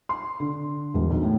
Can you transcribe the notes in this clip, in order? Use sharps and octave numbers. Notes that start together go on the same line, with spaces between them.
C6
D3
E1
B1
A2